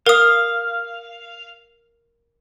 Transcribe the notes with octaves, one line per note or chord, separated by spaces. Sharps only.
A#4 F5 D#6